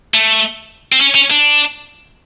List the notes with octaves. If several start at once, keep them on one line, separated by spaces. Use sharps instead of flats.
A3
C4
C#4
C#4
D4